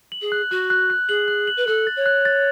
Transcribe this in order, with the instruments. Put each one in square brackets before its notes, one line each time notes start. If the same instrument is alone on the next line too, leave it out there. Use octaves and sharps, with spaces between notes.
[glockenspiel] F#7
[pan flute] G#4
[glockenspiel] F#6
[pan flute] F#4 [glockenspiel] F#6
[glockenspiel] F#6
F#6
[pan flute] G#4 [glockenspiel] F#7
[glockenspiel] F#6
F#7
[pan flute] B4
[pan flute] A4 [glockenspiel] F#6
[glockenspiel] A6
[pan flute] C#5
[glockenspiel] F#6
A6